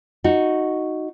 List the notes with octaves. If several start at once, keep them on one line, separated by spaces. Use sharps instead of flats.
D#4 F#4